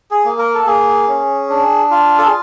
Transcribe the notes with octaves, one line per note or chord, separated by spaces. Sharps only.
G#4
A#3
A#4
A4
A#3 G#4
C#4
D4
F4
A4
G#4